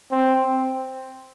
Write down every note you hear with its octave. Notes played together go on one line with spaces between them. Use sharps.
C4